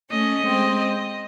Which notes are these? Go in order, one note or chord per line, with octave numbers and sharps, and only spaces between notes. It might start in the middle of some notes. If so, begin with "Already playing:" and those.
A3 C#4 D#5
G#3 C4
D#5